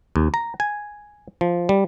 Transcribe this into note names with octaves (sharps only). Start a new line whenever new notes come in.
D#2
A#5
G#5
F3
G3